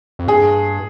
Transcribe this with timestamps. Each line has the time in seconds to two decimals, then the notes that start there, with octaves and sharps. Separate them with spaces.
0.19 F2
0.28 G2 G#4